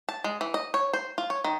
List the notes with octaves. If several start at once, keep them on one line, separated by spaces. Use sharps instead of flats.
A5
G#3
E3
D#5
C#5
C5
F4
C#5
D#3